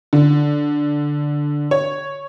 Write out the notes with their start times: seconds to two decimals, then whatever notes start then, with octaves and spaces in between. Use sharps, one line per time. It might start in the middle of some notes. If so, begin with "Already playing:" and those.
0.13 D3
1.71 C#5